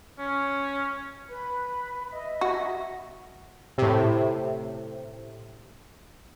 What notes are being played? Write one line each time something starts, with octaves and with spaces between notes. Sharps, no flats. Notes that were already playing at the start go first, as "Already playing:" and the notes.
C#4
B4 B5
D#5 E5
F#4
A2 C3